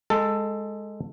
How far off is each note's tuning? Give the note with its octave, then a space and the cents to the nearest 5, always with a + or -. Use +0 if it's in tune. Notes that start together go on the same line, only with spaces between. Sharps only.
G#3 +0 A4 +10